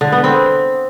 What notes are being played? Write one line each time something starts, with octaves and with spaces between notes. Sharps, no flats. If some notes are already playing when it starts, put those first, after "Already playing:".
D3
B3
C4